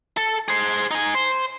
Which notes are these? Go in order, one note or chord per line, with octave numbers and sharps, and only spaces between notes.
A4
G#4 C5
D#4 G#5
C5